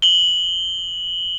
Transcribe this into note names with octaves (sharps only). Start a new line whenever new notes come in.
F#7 G7